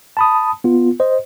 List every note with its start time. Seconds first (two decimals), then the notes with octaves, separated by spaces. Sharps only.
0.17 A5 B5 D#6
0.64 B3 F4
1.00 C5 D#5